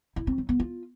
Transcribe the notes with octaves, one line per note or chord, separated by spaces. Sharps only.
E4
C4
F#3
B3
F4